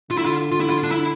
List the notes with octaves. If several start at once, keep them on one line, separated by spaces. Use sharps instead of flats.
D3 F4
E4
F4
F4
E4
F4
D4
E4